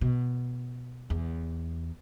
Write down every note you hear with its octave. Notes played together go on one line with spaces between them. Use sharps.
B2
E2